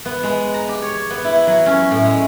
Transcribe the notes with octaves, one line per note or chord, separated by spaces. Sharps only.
B3
G#3
A#5
G4
C#5
B3
E4
F#3
C#4
A2
G#3